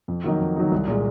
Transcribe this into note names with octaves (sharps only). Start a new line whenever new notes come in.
F2
D#3 F#3 A#3 D#4
F2
D#3 F#3 A#3 D#4
C2
A#2 G#3